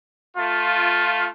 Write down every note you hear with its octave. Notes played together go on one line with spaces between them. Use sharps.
A3 F4